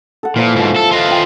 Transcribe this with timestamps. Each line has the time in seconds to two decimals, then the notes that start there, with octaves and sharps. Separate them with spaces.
0.23 A4 F#5
0.36 A#2 E3 F3 E5
0.56 G#2 B2
0.76 A4
0.91 F4 D#5
1.08 C5 G5 G#5